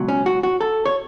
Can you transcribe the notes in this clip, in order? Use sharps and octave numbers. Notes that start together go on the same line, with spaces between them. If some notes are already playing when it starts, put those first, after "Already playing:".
Already playing: C#2 B2 F#3
C#4
F#4
F#4
A4
C#5